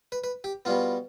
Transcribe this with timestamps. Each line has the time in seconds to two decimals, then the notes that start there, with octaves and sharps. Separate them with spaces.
0.12 B4
0.24 B4
0.44 G4
0.65 B2 G3 B3 F4